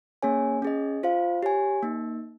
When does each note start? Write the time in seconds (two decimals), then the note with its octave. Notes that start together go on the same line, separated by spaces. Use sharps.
0.22 A#3 C#4 G#4 C#5 G#5
0.62 C#4 G#4 D#5
1.03 F4 C5 F5
1.43 G4 C#5 G#5
1.83 A#3 D#4